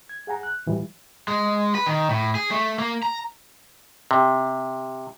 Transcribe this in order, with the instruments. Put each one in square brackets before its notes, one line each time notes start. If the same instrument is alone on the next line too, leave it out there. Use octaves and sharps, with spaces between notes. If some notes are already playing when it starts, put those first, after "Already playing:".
[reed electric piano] G#6
G#4 F#5 G#5 A#5
F#6
A2 E3 F#3 G3
[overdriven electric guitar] G#3
B4
D#3
A2
G#4
A3
A#3
A#5
[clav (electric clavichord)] C3